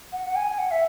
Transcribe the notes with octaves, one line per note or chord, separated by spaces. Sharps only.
F#5
F#5
G#5
G#5
F#5
E5